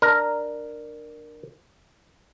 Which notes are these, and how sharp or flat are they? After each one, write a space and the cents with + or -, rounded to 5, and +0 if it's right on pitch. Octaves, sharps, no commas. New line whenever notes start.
D4 +15 A#4 +0